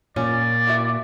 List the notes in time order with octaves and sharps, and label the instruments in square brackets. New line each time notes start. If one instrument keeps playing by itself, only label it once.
[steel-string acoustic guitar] A#2 [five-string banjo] C#4 [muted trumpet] D5
[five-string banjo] E4 F#4 E5